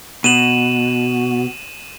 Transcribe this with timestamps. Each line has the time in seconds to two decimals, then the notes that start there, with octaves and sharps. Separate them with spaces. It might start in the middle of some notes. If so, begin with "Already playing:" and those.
0.24 B2 D#7 E7 F#7